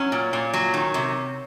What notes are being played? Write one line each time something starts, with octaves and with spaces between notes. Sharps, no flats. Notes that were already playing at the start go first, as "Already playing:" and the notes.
Already playing: F#3 C#4
A#2
A#2
F#3
D#3
C3